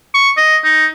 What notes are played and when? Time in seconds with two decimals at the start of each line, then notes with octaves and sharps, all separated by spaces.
0.14 C#6
0.37 D#5
0.64 D#4